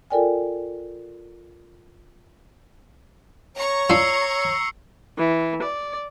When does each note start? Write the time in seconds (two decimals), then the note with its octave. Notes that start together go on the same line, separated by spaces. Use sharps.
0.10 F4 A4 A#4 D5 G5 G#5
3.56 C#5 A#5 C#6
3.90 D4 F4 E6 C7 C#7
5.18 E3
5.63 D5